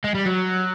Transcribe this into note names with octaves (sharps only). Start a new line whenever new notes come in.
G#3
G3
F#3